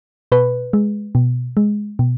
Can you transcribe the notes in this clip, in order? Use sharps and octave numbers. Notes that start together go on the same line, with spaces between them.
B2 B4
G#3
B2
G#3
B2